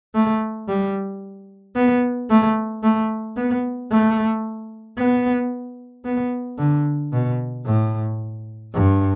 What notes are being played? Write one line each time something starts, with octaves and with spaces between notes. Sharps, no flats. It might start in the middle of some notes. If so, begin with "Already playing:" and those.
A3
G3
B3
A3
A3
B3
A3
B3
B3
D3
B2
A2
G2